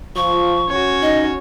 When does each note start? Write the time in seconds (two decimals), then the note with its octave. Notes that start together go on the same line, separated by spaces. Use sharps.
0.16 F3 F4 C#6
0.69 C#4 F#4 C#5
1.02 D#4 D#5